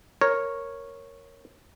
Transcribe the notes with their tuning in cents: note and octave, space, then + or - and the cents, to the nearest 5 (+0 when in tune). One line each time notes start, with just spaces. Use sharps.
A#4 +0 C#5 -5